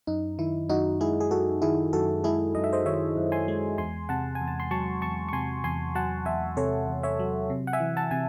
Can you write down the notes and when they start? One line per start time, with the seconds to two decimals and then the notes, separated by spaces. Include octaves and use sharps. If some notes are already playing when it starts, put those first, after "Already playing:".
0.07 F#2 D#4
0.39 D#3 E4
0.69 F#2 D#4 F#4
1.00 G#3 E4 G#4
1.20 G#4
1.31 F#2 F#4 A4
1.62 D#3 E4 G#4
1.93 F#2 F#4 A4
2.24 G#3 E4 G#4
2.55 F#2 D#5
2.64 E5
2.73 C5 D#5
2.86 D#3 C#5 E5
3.17 F#2
3.32 G#5 C6
3.48 G#3
3.78 E2 G#5 C6
4.09 C3 F#5 A5
4.35 G#5
4.41 E2
4.48 A5
4.60 C6
4.71 F#3 A5 C#6
5.02 E2 A5 C#6
5.29 C#6
5.33 C3 G#5 C6
5.64 E2 G#5 C6
5.95 F#3 F#5 A5
6.25 E2 E5 G#5
6.57 C3 A4 C#5
6.88 E2
7.03 C#5 E5
7.19 F#3
7.50 C3
7.67 F#5
7.73 E5 G#5
7.80 E3
7.97 F#5 A5
8.11 C3 G#5